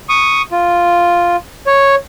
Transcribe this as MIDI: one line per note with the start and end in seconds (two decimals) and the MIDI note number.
0.09 0.42 85
0.09 0.42 87
0.52 1.36 65
1.67 1.95 73